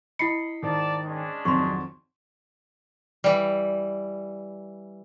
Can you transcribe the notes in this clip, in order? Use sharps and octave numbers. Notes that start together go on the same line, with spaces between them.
E4 D#5 B5 C7 C#7
G#2 D#3 D5 A5
G#3 C#4 D4
G#1 F2 D#3 F#3 C6 C#6
E3 G3